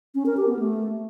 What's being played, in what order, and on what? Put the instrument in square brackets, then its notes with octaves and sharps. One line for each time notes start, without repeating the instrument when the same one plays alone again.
[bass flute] C#4
A#4
G4
B3
A3